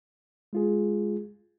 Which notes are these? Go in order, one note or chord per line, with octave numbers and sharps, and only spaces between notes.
G#3 F4 G#4